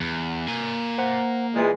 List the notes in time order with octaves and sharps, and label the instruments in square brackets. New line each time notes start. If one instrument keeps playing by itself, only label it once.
[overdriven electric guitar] E2
A#3 G#5
[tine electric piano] C5 F#5 A#5
[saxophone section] A#2 E3 G#3